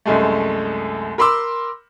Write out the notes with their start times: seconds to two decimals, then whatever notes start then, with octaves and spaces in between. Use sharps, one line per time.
0.06 C2 F#2 G#3 A3
1.18 A#4 B5 C6 D6 E6